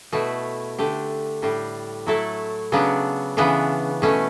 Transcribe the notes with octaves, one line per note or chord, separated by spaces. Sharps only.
B2 A3 E4
D3 A3 D4 G4
A2 G3 D4 G4
F#3 A3 E4 A4
C#3 F#3 B3 D4
C#3 E3 B3 D4
B2 A3 C#4